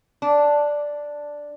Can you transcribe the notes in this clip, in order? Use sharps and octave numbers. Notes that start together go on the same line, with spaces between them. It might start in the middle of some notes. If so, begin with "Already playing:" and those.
D4